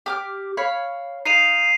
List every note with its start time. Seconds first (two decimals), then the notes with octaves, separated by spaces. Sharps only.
0.06 G4 D6 F6
0.57 C#5 F5 B5
1.25 D#4 F5 C7 D#7 F7